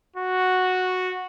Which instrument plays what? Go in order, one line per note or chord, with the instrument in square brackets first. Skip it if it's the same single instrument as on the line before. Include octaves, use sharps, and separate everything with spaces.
[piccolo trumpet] F#4